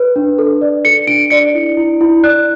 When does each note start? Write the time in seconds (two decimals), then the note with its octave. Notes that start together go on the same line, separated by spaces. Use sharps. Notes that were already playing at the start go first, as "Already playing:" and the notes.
Already playing: B4
0.16 D4
0.38 A4
0.61 D5
0.85 A4 C#7
1.07 D4 D7
1.30 D5 C#7
1.54 E4
1.77 E4
2.01 E4
2.23 D5 F#6